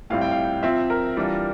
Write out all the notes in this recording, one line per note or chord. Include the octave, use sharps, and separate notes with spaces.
A2 G3 C4 E4 F5
G5
F5
F3 C4 F4 E5
A#4
E3 G3 D4 F4